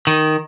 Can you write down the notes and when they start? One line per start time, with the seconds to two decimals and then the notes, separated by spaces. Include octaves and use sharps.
0.07 D#3